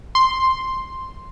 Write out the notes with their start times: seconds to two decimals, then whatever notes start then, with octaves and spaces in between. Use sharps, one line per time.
0.15 C6